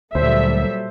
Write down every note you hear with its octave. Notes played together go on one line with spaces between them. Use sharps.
D2 A#2 F#3 G3 A4 C5 E5